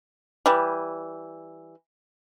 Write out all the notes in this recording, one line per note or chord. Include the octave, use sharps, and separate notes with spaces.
E3 G3